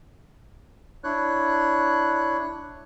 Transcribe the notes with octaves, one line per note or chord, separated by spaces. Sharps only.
D4 E4 C#5 F#6